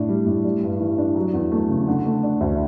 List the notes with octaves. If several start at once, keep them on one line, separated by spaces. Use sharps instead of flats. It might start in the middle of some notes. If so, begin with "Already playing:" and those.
Already playing: A2 D4
G3
A2
G3
G2
E3
D4
F#3
E2
A3
C#3
D3
A3
D4
D2